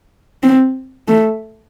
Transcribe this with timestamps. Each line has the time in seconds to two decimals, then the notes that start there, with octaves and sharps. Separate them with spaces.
0.43 C4
1.08 A3